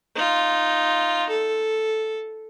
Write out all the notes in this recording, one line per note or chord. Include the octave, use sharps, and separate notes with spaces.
D#4 F4
A4